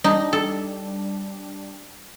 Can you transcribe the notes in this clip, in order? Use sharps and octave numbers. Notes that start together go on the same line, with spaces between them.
G3 D4 D#4
A4